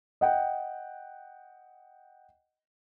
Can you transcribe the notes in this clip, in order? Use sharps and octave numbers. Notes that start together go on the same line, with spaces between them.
D#5 F#5 G5